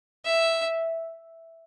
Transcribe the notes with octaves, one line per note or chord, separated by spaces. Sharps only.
E5